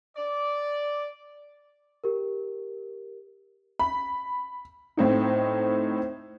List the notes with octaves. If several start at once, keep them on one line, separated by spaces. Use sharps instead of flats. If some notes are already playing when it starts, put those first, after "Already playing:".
D5
G4 A#4
B5
A2 C4 D#4